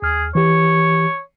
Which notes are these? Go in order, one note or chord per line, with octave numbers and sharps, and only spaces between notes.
D#2 G#4 F6
E3 G4 C#5